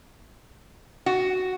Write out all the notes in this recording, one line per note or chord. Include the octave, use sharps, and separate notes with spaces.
F#4